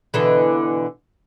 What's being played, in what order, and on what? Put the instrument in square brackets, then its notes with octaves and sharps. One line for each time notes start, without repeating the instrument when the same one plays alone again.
[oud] B2 D3 E3